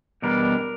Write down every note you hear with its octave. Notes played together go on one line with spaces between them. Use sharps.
E2 B2 G3 B3 D4 A#4